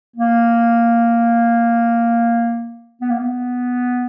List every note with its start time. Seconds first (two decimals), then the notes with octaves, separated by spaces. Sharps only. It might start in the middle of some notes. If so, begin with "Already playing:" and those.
0.16 A#3
3.01 B3
3.10 A#3
3.19 B3